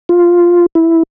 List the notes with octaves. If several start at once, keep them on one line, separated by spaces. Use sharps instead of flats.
F4
E4